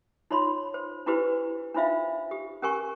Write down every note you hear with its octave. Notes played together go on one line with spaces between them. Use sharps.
D#4 F4 C#5 B5 C6
C5
D4 E4 F#4 G4 B4 C5
D4 D#4 F4 C5 E5 F5
G4
C#4 G4 A#4 G#5 C#6